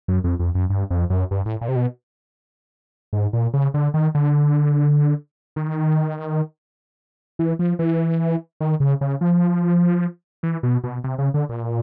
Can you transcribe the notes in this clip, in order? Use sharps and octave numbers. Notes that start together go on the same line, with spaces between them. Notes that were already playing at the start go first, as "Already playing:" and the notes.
F#2
F2
F2
F#2
G2
F2
F#2
G2
A2
A#2
C3
B2
G#2
A#2
C#3
D3
D#3
D3
D#3
E3
F3
E3
D#3
C#3
C#3
F3
E3
B2
B2
C3
C#3
D3
A#2